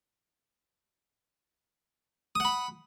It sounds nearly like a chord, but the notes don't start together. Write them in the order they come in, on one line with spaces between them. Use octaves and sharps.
D#6 F#5 B5